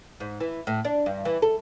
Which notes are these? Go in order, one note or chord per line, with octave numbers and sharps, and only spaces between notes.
G#2
E3
A2
D4
G2
E3
A4